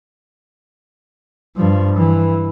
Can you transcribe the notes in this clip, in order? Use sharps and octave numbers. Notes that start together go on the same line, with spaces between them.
G2 F3
E3